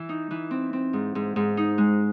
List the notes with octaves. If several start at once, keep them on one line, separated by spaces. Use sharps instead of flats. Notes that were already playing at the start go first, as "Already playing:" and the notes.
Already playing: E3
D#4
E3
C4
C4
G#2
G#2
G#2
D#4
G#3